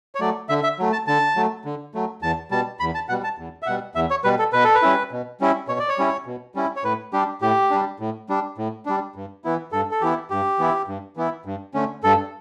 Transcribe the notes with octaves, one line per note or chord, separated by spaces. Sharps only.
C#5
F#3 A3 D5
D3 E5
E5
F#3 A3
A5
D3 A5
F#3 A3
D3
F#3 A3
E2 A5
B2 G3 A5
E2 B5
A5
B2 G3 F#5
A5
E2
E5
B2 G3 F#5
E2 E5
C#5
B2 G3 B4
A4
B2 B4
A4
B4
G3 C#4 E4
B2
G3 C#4 E4
B2 C#5
D5
C#5
G3 C#4 E4
B2
G3 C#4 E4
C#5
A2 B4
G3 D4 G4
A2 G4
G3 D4
A2
G3 D4
A2
G3 D4
G2
E3 B3 E4
G2 A4
A4
E3 B3 E4 G4
G2 G4
E3 B3 E4
G2
E3 B3 E4
G2
D3 A3 C#4
G2 A4